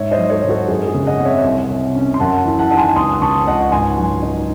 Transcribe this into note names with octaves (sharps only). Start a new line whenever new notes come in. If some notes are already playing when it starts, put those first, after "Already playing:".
Already playing: G#2 C#5 E5
C5 D#5
F#3
A4 C#5
G#2
F#4 A4
F#2 G#4
G#4
C#3
D#5 F#5
C4
C#5 E5
C2
C3
C#4
C6
F#2 F#5 A5
E3
F#5 A5
D#4 A5
G#5 C6
C#2 C6 D#6
D#6
C#3 A5 C#6
C#2 D#5 F#5
G#2 G#5 C6
F#3
D#4